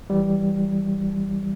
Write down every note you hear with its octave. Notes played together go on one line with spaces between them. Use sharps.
E3 G3